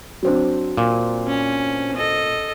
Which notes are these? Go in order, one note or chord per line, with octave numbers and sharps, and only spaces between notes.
F#3 C4 D4
A#2
C#4
A4 D#5